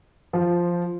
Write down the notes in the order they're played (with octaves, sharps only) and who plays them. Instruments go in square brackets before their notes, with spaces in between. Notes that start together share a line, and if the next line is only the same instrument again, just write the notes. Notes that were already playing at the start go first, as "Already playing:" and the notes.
[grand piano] F3